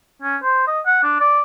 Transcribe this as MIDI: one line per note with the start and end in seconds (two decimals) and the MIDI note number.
0.22 0.36 61
0.43 0.65 72
0.67 0.80 75
0.86 1.02 78
1.03 1.19 62
1.20 1.43 74